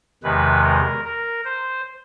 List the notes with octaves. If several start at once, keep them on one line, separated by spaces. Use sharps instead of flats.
E2 C3 D#3 G#3 B4
A#4
A#4
C5